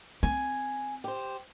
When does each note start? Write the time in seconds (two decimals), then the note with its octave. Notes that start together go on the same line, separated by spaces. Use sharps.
0.23 C4 G#5
1.04 G4 C5